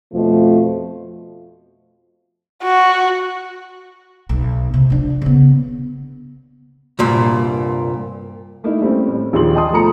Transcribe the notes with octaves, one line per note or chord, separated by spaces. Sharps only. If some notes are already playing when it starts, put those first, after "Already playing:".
F2 B2 F3 A3
F#4
B1
C3
F3 D4
C#3 B3
C2 G2 A#2
A3 A#3 D#4 E4
G3 A3 C4 C#4
A2 G3
A#1 D#2 G4 G#4 C6 F#7
D#5 G5 A5 C6 D#6
B2 F3 A3 A4 A#5 C#7